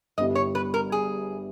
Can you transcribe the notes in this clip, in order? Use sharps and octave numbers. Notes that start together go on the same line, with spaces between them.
G1 G2 G3 B3 E4 D#5
C#5
B4
A#4
G#4